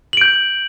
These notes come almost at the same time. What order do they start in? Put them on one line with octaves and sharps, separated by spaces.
F#7 D7 G6